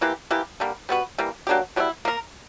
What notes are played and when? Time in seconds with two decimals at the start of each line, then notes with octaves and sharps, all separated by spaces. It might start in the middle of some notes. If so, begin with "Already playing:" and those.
0.01 E3 A#3 E4 G4
0.31 E3 A#3 E4 G4
0.60 D3 G3 A#3
0.89 G3 B3 F#4 B4
1.18 E3 G3 A#3
1.47 F#3 A#3 D4 G4
1.76 B2 G3 C#4 E4
2.05 A#3 D4 A#4